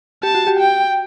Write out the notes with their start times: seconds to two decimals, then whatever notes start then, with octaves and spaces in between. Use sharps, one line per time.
0.23 G4 A5
0.35 F#4
0.47 G4
0.60 G5